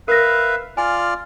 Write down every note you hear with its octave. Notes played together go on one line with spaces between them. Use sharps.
A#4 B4 E5 F5 A#6
F4 D5 G#5 F6